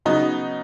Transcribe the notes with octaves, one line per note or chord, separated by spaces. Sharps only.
C#3 F#3 B3 D#4